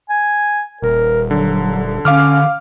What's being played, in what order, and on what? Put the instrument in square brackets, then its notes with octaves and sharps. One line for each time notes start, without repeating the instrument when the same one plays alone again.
[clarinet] G#5
[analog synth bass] D#1 [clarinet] A#4
[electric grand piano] D3 [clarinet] F#3
[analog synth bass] D3 [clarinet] C#4 [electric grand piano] F5 D6 F6